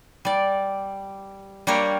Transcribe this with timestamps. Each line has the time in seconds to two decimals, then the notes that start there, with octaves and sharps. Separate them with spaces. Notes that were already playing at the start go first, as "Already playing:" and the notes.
0.25 G3 D5
1.67 G3 A#3 D4 G4 A#4 C#5